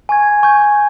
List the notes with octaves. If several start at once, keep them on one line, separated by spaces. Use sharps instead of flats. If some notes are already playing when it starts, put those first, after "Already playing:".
G#5 C#6 G#6
G#5 C#6 G6